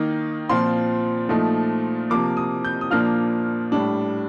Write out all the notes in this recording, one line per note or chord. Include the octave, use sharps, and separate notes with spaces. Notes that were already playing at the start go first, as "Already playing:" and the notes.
Already playing: D#3 A#3 D#4
A#2 F3 C4 F4 C6
A#2 F3 A3 D#4
C3 F3 A#3 D6
D#6
G6
D#6
A#2 F3 A#3 D4 F4 F6
A2 G3 D4